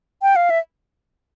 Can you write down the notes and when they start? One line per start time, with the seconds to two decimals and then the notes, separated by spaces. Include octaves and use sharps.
0.22 G5
0.36 F5
0.50 E5